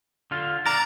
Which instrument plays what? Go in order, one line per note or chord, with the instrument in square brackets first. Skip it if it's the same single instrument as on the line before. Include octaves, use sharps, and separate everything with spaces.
[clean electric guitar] D3 F4
[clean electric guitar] D4 A#4 [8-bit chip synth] A#5 A6